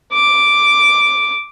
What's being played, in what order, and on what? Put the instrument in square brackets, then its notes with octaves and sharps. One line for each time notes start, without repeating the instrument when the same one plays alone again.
[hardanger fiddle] D6